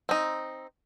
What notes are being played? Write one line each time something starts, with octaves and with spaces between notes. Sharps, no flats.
C4 D#4